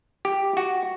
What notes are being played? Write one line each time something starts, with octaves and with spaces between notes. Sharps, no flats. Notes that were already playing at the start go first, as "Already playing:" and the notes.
G4
F#4